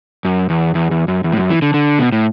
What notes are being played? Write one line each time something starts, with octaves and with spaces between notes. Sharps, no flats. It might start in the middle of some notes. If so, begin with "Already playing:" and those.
F#2
E2
E2
E2
F#2
E2
A2
F#2
E3
D3
D3
B2
A2